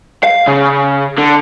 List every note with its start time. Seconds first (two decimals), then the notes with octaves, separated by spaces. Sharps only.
0.24 F5
0.47 C#3
1.18 D3